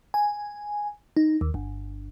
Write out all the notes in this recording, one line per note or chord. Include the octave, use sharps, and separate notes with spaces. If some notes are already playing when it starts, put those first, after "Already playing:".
G#5
D#4
D#2
G1